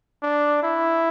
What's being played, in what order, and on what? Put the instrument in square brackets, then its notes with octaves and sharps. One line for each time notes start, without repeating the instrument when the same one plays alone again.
[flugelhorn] D4
E4